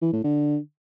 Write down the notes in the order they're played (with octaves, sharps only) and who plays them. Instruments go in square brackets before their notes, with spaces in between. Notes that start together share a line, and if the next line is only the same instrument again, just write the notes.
[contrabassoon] E3
A2
D3